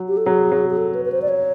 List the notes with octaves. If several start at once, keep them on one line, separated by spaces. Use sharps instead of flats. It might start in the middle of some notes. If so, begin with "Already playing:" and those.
Already playing: F#3
G4
A4
F#3 G#4
F#3
G#4
A4
B4
B4
C5
D5
C#5